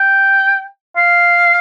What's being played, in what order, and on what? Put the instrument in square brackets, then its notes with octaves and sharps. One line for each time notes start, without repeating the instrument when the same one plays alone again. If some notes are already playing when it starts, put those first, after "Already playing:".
Already playing: [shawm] G5
F5